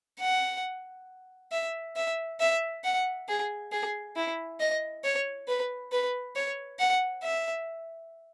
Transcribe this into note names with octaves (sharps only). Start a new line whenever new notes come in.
F#5
E5
E5
E5
F#5
G#4
G#4
E4
D#5
C#5
B4
B4
C#5
F#5
E5